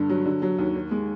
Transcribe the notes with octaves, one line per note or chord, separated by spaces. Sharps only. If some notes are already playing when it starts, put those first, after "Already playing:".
Already playing: G2 D3
F#3
D3
F#3
D#2
D#3
G#3